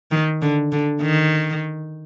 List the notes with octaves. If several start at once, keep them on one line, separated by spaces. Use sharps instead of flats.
D#3
D3
D3
D#3